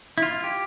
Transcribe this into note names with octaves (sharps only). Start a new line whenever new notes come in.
E4
F4
G4